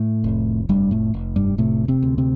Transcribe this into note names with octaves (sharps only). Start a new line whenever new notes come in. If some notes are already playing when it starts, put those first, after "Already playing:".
Already playing: A2 A3
F1
F1 G2 G3
A2 A3
F1
G2 G3
A2 C3 A3
C3 C4
D2
C3 C4